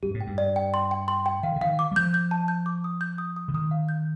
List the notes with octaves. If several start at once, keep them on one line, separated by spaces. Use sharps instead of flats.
G2 G4
A2
G5
G2
D5
G5
C6
G5
C6
G5
D#3 F5
D3
D#3 F5
D6
G3
F3 G6
G6
A5
G6
D6
D#6
G6
D#6
D#6
D3
D#3 D#6
F5
G6